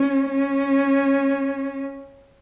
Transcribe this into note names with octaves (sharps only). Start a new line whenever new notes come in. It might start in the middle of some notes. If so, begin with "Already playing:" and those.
Already playing: C#4
C#4